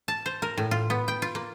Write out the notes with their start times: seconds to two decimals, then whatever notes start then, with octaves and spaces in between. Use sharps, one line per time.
0.08 A5
0.26 C5
0.42 A#4
0.58 A2
0.71 F4
0.90 B3
1.08 G5
1.22 F4
1.35 A#3